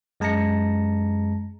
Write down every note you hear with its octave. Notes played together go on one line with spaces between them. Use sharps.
F#2 G#3 A5 A#5 A#6 C#7